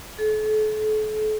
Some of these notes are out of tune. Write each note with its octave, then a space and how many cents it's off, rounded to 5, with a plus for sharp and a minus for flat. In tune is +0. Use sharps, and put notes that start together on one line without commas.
A4 -40